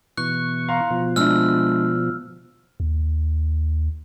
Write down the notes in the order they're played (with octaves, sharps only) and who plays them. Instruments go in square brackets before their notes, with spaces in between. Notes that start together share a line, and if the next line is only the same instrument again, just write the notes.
[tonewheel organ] B2 E3 C#6 [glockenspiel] F#6
[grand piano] F5 A#5 C6
[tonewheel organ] B2 F3
[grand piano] G#3 D4 E4 [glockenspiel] E6 F6
[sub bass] D#2